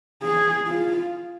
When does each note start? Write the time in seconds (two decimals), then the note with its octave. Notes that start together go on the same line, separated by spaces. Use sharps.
0.23 G#4
0.67 F4